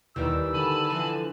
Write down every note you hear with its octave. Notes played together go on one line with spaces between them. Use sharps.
D#2 D#3 E3 G3 E6
D3 G#5 A5 B5
E3 F3